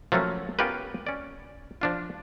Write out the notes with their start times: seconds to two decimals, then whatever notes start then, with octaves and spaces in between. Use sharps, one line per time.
0.12 F3 F#3 A3 A#3 C#4
0.59 B3 C#4 F4 G4 A#4 B4
1.07 C#4 D5
1.81 F3 D4 F4